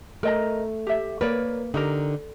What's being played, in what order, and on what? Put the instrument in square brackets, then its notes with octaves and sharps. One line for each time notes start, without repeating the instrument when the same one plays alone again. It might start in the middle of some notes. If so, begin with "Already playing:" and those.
[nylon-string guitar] A3 [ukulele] A#4 D#5 A#5
[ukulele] G4 E5
[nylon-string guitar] A#3 B4 [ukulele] A#4 C#5 D5
[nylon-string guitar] D3 [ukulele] D#4 G4 A#4